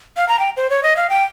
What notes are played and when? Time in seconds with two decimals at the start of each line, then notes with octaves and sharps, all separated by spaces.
0.17 F5
0.29 A#5
0.39 G5
0.57 C5
0.70 C#5
0.83 D#5
0.97 F5
1.10 G5